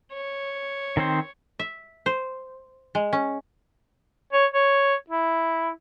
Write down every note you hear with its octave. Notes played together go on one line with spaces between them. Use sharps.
C#5
D#3 C4 C5
E5
C5
G#3
C#4
C#5
C#5
E4